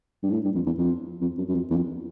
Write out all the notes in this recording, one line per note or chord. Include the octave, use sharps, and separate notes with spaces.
G2
G#2
A2
G2
F2
E2
F2
F2
F#2
F#2
F2
E2
F2